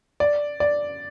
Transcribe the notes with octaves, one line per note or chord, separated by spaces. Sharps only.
D5
D5